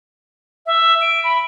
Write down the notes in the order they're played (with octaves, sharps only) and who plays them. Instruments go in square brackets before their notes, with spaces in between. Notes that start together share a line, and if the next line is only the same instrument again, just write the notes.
[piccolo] E5
D7
B5